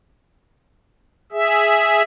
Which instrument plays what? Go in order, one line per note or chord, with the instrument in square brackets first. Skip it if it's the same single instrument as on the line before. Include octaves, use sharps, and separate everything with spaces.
[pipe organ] G#4 E5